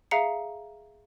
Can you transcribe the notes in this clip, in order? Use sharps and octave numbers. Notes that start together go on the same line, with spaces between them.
G#4 E5 F5 A#5 C7 C#7